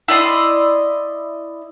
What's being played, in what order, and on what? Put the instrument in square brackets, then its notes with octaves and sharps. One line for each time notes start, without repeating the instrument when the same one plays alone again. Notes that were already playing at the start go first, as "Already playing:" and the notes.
[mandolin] E4 D5 D#5 C6